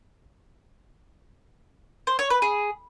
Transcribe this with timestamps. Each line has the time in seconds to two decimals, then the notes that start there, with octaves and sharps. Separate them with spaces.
2.07 C5
2.19 C#5
2.30 B4
2.42 G#4